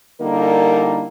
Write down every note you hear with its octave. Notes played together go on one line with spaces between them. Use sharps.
D3 G3 A#3 D#4 E4 A#4